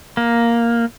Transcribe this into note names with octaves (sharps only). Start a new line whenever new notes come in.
A#3